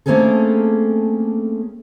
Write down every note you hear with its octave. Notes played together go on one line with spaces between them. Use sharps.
A3 A#3 C4 C#4 G#4 A4